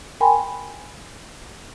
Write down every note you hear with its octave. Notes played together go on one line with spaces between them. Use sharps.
A#4 G5 G#5 B5 C6